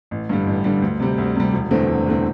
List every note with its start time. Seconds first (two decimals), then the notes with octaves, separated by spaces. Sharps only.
0.11 A1
0.29 G2 D3 G3
0.47 A1
0.64 G2 D3 G3
0.82 D2
1.00 C3 G3
1.18 D2
1.36 C3 G3
1.53 E1
1.71 E2 D3 A3 C4
1.89 E1
2.06 E2 D3 A3 C4